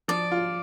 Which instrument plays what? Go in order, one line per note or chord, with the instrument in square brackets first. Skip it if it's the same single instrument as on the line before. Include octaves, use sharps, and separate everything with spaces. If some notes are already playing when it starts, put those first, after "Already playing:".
[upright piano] F3 [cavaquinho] D5
[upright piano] F4